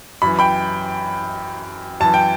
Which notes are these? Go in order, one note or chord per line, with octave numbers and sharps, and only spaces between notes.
F#2 E3 B5
G5 B5
F#2 E3 A5
G5